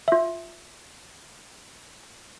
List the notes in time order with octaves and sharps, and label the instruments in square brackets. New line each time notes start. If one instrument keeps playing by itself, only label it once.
[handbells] F4 E5